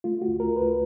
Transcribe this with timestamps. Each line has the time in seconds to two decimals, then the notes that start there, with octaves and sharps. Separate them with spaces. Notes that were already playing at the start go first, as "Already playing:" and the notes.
0.04 A3 F4
0.22 F#4
0.28 D2
0.40 A#4
0.50 D2
0.56 B4